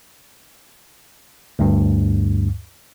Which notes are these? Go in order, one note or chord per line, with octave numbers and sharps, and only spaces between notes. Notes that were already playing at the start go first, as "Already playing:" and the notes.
D2 G2